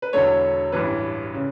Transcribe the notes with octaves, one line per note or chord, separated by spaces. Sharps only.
B4
E1 E2 D3 A3 C#5
A1 G2 E3 B4
C#3